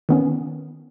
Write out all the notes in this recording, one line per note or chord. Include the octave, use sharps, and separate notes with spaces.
D#3 B3 C#4